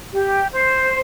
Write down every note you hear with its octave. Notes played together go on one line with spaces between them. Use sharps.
G4
C5